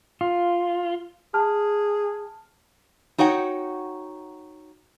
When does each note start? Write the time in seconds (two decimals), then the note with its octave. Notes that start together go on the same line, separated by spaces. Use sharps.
0.21 F4
1.34 G#4 A5 F6
3.18 D#4 F#4 C#5 F#5 G5